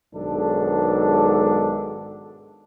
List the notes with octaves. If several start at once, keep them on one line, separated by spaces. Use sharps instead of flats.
B1 G#2 D#3 G#3 D4 A4